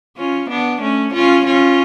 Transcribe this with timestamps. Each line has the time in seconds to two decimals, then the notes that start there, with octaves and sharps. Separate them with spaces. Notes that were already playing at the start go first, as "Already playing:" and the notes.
0.17 C#4 F4
0.50 B3 D4
0.81 A3 C#4
1.13 C#4 F4
1.46 C#4 F4